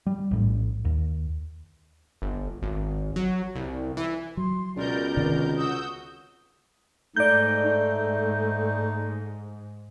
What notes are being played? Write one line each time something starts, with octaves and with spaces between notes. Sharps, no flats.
G3
A#1 A2
D#2
G1
G#1
F#3
C2
E3
F#3 C6
C#2 B2 A#4 D5 G6
C3 D#3
F#4 D#6 E6 G6
G#2 A3 D#4 D5 G6
D#4